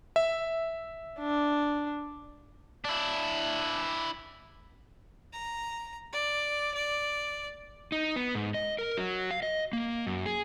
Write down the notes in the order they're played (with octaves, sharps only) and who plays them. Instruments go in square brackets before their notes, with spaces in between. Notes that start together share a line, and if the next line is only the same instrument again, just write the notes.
[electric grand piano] E5
[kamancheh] D4
[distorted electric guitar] D4 E4
[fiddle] A#5
D5
D5
[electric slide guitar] D#4
B3
G#2
D#5
A#4
F#3
F5
D#5
A#3
F#2
G#4